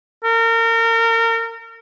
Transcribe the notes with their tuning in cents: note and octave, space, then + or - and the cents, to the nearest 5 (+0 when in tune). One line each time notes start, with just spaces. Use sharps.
A#4 -30